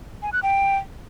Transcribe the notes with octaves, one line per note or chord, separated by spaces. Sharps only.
G#5
F#6
G5